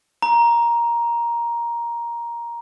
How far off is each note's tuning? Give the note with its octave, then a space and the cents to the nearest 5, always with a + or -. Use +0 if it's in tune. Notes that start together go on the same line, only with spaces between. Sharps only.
A#5 +10